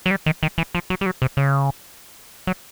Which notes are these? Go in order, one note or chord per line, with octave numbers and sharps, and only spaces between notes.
F#3
G3
D#3
D#3
E3
F3
F#3
G3
F#3
C3
C#3
F#3